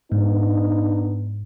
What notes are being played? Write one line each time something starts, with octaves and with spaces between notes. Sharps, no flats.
G#2 B3 D4 D#4